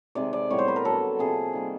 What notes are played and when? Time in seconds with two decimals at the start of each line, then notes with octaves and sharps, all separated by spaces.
0.15 C3 D#3 G#3 D5
0.33 D5
0.50 A2 E3 G3 B3 C#5
0.59 C5
0.68 B4
0.76 A#4
0.85 D3 F#3 B3 A4
1.19 C3 F3 A#3 G#4
1.53 D#3 G3 A#3